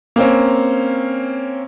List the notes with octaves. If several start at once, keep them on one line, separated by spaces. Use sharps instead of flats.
A#3 C4 C#4